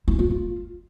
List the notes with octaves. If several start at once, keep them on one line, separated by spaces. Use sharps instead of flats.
E4
F4
F4